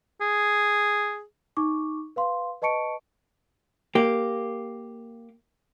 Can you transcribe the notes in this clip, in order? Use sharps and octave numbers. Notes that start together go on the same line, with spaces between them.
G#4
D#4 C#6 D6
B4 F5 C6
B4 D#5 A5 C#6 C#7 D7
A#3 G4